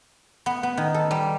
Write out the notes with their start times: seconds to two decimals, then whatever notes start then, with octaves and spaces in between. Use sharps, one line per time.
0.46 B3
0.63 B3
0.77 D#3
0.94 A4
1.11 G3